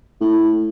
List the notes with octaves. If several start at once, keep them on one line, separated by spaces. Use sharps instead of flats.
A2